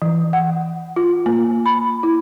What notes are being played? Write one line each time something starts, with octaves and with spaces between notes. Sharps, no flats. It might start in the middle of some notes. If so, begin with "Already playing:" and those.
E3
F#5
F4
A#3
B5
E4